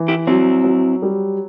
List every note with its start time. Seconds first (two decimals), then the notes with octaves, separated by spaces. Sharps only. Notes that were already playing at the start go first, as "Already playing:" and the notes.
Already playing: E3
0.08 E4 G4
0.27 F#3 C4 E4
0.64 F#3
1.02 G3